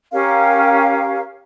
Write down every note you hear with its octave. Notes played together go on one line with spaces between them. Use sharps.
C#4 G4 A#4 F5